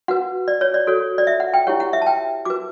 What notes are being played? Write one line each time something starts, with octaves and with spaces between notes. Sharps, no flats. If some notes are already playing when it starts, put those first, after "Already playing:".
F#4 B4 F#5
D5
C#5
D5
F#4 A4 C#5
D5
E5
F#5
G5
E4 G4 C#5 F#5
F#5
E5
A5
G5
F#4 B4 D6